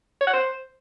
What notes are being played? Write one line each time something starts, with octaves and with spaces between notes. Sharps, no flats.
C#5
F#5
C5